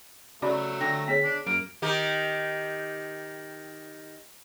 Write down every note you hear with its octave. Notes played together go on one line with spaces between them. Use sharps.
C#3 F#3 A3 F#4 D5 E5 B5
D3 G5 A#6
B3 G#4 C#5 B6
D4
F#2 A#3 D7
D#3 D#4 G4